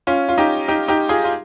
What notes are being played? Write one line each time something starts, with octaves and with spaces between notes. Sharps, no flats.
C#4 F4
F4
D#4 G4
D#4 G4
D#4 G4
F4 G#4
F4